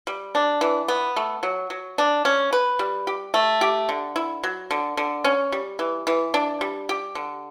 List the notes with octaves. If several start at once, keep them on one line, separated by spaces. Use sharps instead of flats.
G3
D4
E3
B3
A3
F#3
F#3
D4
C#4
B4
G3
G4
A3
G4
D3
E4
F#3
D3
D3
C#4
G3
E3
E3
D4
G3
G4
D3